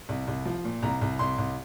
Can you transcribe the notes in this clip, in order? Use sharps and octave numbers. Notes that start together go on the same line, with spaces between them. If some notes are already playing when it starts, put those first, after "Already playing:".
C2
C2
F3
A#2
C2 A#5
C2
C2 C6
C2